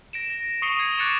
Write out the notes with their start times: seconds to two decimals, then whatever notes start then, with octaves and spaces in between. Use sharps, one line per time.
0.13 A#6 D7 E7
0.30 A#6
0.62 C#6 D#6 C7 C#7 D#7 G7
0.79 G#6
0.98 D6 F#6 A6 C#7 D7 E7